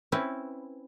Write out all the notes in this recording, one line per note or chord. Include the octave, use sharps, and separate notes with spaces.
C4 C#4 E4 B4